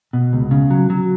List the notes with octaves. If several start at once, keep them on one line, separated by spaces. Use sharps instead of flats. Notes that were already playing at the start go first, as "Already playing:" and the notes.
B2
C#2
C#3
F#3
F#3